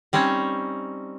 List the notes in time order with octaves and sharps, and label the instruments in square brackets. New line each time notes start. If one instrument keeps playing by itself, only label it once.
[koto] G3 C4 C#4 D#4 C#5